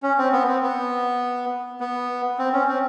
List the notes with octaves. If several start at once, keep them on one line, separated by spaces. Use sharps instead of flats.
C#4
C4
B3
C4
B3
B3
C4
C#4
C4